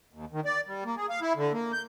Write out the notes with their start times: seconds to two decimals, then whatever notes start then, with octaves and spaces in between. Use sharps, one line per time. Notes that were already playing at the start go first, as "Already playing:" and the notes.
0.13 D#2
0.32 D#3
0.45 D5
0.67 G3
0.85 A#3
0.97 G#4
1.10 F5
1.21 E4
1.36 D3
1.53 A#3
1.73 G6